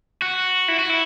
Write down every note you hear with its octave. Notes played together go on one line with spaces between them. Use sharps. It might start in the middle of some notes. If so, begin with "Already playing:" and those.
F#4
E4
F#4
E4